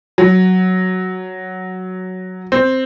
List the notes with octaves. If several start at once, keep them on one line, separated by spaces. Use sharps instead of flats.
F#3
C4